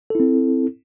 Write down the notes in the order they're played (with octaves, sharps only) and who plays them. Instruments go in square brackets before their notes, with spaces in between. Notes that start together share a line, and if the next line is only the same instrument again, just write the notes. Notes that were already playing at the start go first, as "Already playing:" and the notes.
[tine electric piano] A4
E4
C4